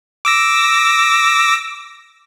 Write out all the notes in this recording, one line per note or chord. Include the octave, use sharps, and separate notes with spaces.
D6 E6 A#6